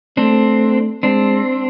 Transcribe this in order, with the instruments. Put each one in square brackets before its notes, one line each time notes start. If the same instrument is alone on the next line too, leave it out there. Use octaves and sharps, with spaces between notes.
[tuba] A3 [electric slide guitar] C4 D4
[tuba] G#3 [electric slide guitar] C4 D4